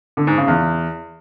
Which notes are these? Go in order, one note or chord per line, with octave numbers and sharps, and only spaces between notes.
D3
G#2
C#3
E2